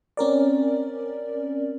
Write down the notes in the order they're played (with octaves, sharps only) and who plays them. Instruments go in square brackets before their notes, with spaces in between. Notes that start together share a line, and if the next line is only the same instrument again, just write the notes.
[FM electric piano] C4 C#4 A#4 D5